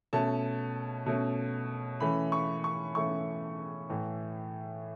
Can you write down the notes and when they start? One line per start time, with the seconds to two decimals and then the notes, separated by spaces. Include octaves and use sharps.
0.13 B2 A3 C#4 A5
1.06 B2 A3 C#4
2.00 E3 A3 C#4 B5
2.32 C#6
2.64 C#6
2.95 E3 A3 C#4 C#6
3.90 A2 E3 A3